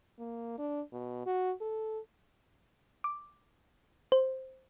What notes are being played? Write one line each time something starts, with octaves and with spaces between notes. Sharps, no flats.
A#3
D4
B2
F#4
A4
D6
C5